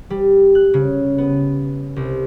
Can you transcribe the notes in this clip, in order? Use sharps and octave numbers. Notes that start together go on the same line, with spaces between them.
G3
F#6
C#3
B3
C2